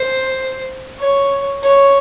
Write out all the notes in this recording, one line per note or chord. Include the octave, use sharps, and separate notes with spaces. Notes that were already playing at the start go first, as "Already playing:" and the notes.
Already playing: C5
C#5
C#5